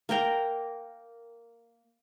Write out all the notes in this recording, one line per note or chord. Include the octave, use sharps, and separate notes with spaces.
A#3 A#4 G5 A#5